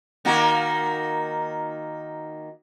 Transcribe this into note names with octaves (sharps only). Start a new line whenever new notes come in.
D#3 A#3 F#4